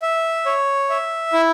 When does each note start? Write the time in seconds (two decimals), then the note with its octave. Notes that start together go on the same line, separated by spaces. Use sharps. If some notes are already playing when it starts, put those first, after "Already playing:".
0.02 E5
0.46 C#5
0.90 E5
1.33 E4